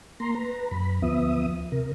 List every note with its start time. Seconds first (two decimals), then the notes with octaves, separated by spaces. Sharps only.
0.20 A#3 A#5 C6
0.35 B4 A#5
0.71 F#2 B5
1.02 D2 F3 B3 E5 D#6
1.72 C3 A#4